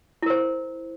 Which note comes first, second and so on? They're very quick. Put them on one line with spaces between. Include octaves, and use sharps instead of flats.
E4 A#4 C5